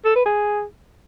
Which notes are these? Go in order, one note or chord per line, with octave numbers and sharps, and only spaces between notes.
A4
B4
G#4